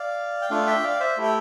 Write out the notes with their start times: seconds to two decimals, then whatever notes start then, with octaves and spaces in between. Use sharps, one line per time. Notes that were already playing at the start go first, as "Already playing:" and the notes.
Already playing: D5 F5
0.42 G5
0.50 A3 D4 F4 D5 F5
0.67 E5 G5
0.84 D5 F5
1.00 C5 E5
1.17 A3 E4 G4
1.23 G5